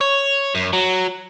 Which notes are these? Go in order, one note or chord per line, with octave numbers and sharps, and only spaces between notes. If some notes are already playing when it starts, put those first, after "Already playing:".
C#5
F#2
F#3